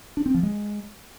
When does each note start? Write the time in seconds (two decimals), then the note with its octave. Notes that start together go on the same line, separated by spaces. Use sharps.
0.17 D4
0.26 C4
0.34 F3
0.43 G#3